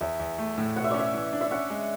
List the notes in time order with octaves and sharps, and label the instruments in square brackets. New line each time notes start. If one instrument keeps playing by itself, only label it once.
[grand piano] E2 [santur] E5
[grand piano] E2
A3
A2
[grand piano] B2 [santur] F#5
[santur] E5
[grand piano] C#4 [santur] D5
[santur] E5
[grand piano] E3
D4
[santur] E5
[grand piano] C#4 [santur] F#5
[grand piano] G#3